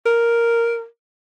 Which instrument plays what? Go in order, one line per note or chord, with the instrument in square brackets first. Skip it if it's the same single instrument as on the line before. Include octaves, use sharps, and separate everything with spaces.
[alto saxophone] A#4